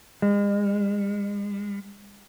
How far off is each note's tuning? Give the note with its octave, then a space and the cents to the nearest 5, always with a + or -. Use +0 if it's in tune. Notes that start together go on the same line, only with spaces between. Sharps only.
G#3 -40